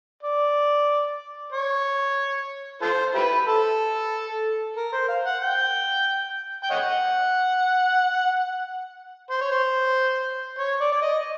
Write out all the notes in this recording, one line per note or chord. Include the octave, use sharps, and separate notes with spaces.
D5
C#5
F4 A4 C5
E4 G4 B4
A4
A#4
C5
F5
F#5
G5
G5
C#5 D#5 F#5
C5
C#5
C5
C#5
D5
D5
D#5